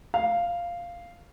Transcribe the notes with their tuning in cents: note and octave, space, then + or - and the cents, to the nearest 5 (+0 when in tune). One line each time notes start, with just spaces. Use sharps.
F5 -5